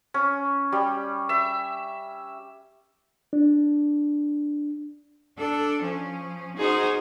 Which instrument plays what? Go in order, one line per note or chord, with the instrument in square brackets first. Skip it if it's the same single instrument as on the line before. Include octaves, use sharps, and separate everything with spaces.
[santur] C#4
G3
E5
[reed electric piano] D4
[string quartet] D4 A4
F3 C#4
D#4 F#4 G#4 A#4 C5